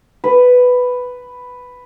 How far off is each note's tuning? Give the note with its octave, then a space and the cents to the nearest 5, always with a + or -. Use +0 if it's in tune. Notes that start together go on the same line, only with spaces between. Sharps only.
B4 +5